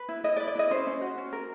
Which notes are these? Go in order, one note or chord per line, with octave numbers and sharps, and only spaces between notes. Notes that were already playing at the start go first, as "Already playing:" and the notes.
Already playing: B4
E4
E4 D#5
D5
B4
D5
E4 D#5
C#4 C5
C#4
F#4
C#4
A#4